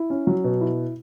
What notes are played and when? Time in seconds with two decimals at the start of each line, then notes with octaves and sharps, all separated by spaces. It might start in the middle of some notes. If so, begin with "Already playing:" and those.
Already playing: E4
0.10 C#4
0.27 F#3
0.44 B2
0.61 E4